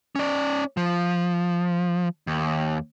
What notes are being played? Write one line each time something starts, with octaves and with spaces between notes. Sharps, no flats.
C#4 D5
F3
D#2